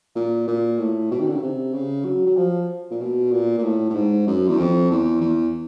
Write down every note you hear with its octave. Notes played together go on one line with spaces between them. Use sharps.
A#2
A#2
A2
B2
D#3
D3
C#3
C3
C#3
F#3
F#3
F3
A#2
B2
A#2
A#2
A2
A2
G#2
F#2
E2
F2
E2
E2